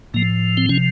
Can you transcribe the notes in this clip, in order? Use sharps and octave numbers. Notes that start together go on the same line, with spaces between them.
A2 F3 A#3
C4
C3 F3 C#4